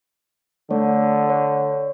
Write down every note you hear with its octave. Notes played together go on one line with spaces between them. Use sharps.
D3 A3 C#5
C#5